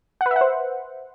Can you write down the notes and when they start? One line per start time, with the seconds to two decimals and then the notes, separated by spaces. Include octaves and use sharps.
0.21 F#5
0.26 B4
0.31 E5
0.36 F#5
0.41 C5